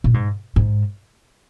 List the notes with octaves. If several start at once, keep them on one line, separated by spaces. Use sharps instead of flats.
A#2
G#2
G#2